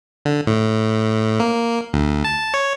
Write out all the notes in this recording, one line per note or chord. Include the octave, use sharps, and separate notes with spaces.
D3
A2
A#3
D2
A5
C#5